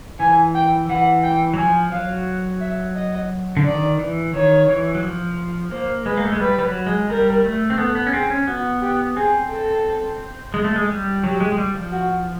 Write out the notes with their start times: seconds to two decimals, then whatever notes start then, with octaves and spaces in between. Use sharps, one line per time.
0.20 E3 G#5
0.55 G5
0.90 E3 F#5
1.23 G5
1.54 F#3
1.58 F3 G#5
1.92 F#3 F5
2.61 E5
2.96 D#5
3.57 D3
3.64 D#3 D5
3.99 E3
4.34 D#3 C#5
4.68 E3
4.95 F#3
5.03 F3
5.71 A#3 C5
6.06 G#3 B4
6.17 A#3
6.25 A3
6.32 G#3
6.40 G3 B4
6.59 G3
6.63 F#3
6.87 G#3
7.09 G3 A#4
7.44 A3
7.70 C4
7.78 B3 A4
7.95 B3
8.07 C#4
8.13 C4 G#4
8.30 C#4
8.47 B3 F#4
8.82 G4
9.16 C4 G#4
9.50 A4
10.54 G#3
10.65 A3
10.76 G#3
10.89 G3
11.24 F#3 G4
11.40 G#3
11.52 G#3
11.58 G3
11.74 F3
11.92 F#4